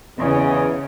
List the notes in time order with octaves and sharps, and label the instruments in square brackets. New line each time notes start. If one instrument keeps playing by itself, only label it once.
[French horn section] E2 [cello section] C#3 [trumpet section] C#4 G#4 D#5